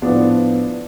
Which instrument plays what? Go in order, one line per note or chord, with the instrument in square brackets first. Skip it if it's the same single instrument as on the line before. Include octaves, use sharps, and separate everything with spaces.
[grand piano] A2 F3 B3 D4